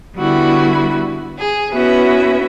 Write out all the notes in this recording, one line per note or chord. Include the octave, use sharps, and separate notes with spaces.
D3 G3 B3 E4 F#4 B5
G#4
B3 C#4 E4 F#4 B4 E5